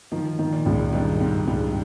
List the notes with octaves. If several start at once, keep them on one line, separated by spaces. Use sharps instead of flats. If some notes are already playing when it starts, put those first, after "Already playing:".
D#3 F3
D#3
A#2
C#2
A#2
G2 D#3
G#2 C3
C#2 G2